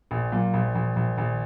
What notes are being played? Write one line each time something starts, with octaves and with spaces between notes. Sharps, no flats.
A#1
A#2 F#3
A#1
A#1 F3
A#1 F3
A#1 D#3